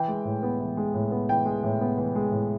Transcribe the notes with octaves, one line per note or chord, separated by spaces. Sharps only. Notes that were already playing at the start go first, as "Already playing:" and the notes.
Already playing: E3 G5
G#3
A2
B3
E3
G#3
A2
B3
E3 G5
G#3
A2
B3
E3
G#3
A2